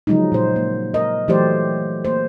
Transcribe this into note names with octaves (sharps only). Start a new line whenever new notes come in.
C#3 F3 F#3 G#3 C#4 D#4
A#2 C5
A#3
A#4 D#5
E3 F#3 A3 G4 C5 D5
A#3 C5